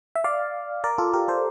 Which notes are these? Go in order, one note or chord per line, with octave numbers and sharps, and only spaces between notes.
E5
D5 F5
A#4 D5
F4 A4
G4 A#4
A4 C5